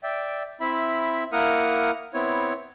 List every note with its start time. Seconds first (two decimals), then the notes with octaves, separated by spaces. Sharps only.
0.03 D5 E5 G5
0.60 C4 E4 E5 B5
1.32 A#3 E4 A#4 F#5 D#6 F6
2.14 B3 C4 E4 C#5